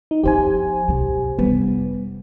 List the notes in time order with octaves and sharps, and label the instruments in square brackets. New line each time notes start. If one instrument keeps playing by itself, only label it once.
[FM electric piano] D#4
[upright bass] F3 B3 [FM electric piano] G4 C5 G#5
[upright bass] B2 A3
[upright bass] F1 G3 [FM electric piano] B3